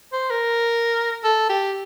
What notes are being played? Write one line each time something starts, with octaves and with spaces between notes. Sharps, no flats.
C5
A#4
A4
G4